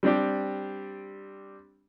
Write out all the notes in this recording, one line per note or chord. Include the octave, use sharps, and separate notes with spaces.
G3 C4 D4 G4